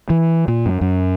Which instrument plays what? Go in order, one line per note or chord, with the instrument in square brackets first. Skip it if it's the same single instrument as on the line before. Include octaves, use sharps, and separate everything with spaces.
[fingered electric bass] E3
A#2
F#2
F#2